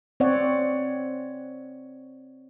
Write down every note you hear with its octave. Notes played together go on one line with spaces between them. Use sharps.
C4 C#5 D5 F#5